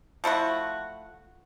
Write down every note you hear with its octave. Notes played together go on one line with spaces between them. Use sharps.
F3 A3 E4 F#4